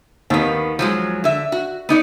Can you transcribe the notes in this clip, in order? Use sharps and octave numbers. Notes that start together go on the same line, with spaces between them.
D#2 D#3 B3
F3 F#3 G#3
D3 E5
F#4
B3 D#4 D5